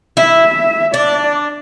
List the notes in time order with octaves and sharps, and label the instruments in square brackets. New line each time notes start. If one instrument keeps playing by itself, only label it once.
[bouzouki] E4 [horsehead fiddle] E5
[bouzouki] D4 [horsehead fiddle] D5